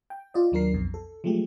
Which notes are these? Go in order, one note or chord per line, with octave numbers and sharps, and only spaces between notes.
G5
F4 D5 D#5
D#2 F#3 D4 A#4 C7
B1 F2 B2
A4
F3 F#3 G#3 A3 G4